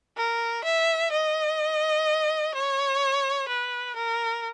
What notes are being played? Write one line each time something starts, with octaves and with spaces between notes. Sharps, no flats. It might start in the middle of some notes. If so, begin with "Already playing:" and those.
A#4
E5
D#5
C#5
B4
A#4